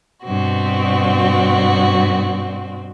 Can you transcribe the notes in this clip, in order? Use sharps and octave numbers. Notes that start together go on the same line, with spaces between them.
G2 B2 C4 F#4